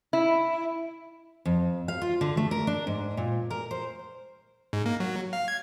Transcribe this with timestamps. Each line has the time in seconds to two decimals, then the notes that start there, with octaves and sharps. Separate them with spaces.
0.13 E4
1.45 F2
1.88 F5
2.02 F4
2.21 D3
2.37 A3
2.51 A#4
2.67 D4
2.87 G#2
3.17 A#2
3.50 A#4
3.71 C5
4.73 G#2
4.86 A#3
5.00 F#3
5.33 F5
5.48 G#6